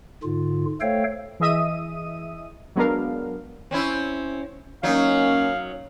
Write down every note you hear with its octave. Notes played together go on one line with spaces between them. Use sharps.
G#2 D3 F4
A3 A4 C5 C#5 F5 G5
E3 G#4 D#5 E5 D#6 D#7
F#3 G#3 B3 D4 A#4 F5
C4 C#4 E4
F#3 A#3 C#4 D#4 F5